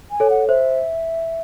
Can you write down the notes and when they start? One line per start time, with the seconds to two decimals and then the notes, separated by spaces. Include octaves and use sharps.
0.11 G#5
0.20 A4 C#5
0.30 F#5
0.48 C5 E5